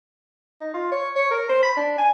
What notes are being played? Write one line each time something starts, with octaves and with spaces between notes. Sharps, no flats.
D#4
F4
C#5
C#5
A#4
C5
B5
D4
G#5